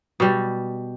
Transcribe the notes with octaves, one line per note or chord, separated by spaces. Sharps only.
B2 G3